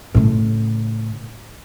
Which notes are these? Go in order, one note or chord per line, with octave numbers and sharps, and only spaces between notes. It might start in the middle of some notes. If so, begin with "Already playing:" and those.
A2 C#3